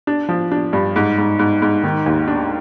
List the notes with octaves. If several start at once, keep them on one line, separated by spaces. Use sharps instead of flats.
D4
F3
D4
G2
G#2
G#2
G#2
G#2
D#3
D#2
D4